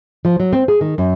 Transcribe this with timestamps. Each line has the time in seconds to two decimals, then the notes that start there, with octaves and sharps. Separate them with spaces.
0.25 F3
0.40 F#3
0.53 C4
0.68 G#4
0.81 D#3
0.98 F#2